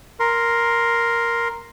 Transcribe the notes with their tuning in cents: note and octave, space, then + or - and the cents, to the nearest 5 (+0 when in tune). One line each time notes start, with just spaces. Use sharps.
A#4 +0 C6 +0